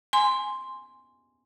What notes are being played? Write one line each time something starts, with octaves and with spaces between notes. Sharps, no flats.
G#5 C6